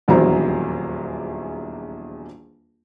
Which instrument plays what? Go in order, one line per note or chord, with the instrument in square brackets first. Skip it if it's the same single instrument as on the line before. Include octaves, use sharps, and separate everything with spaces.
[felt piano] D#1 A#1 E2 F#3 C5 A#5